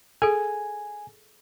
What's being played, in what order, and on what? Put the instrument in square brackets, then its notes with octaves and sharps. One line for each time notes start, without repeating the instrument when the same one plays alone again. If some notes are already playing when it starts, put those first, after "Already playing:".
[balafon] G#4 A4 [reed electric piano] G#5